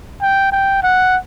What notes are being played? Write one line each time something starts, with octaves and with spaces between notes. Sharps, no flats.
G5
G5
F#5